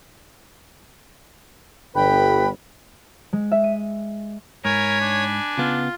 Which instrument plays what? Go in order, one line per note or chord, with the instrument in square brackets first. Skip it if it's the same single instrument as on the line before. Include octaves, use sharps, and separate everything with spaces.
[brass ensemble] G1 [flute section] B4 G5 B5
[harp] G#3
E5
D#7
[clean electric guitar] G#2 [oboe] A#4 [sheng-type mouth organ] C#5 [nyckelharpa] G#5 B5
[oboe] D4
[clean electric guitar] C#3 B3 [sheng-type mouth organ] F4